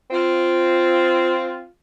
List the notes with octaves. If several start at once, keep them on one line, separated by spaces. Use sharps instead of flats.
C4 F4